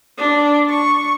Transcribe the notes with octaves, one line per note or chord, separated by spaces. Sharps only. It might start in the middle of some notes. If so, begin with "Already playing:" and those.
D4
C#6